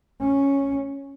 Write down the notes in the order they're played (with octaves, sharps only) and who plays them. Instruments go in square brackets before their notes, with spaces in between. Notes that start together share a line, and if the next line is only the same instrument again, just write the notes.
[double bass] C#4